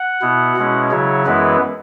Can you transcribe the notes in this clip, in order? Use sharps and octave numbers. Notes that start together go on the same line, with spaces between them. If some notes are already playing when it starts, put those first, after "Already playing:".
Already playing: F#5
B2 B3 E4
B2 G#3 C#4 E4
C#3 F#3 E4 C#5
F#2 E3 G#3 B3 E4 B4